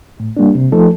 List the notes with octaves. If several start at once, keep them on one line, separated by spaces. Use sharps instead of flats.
A2
G3 A#3 D4
C3
F3 A3 D#4 A4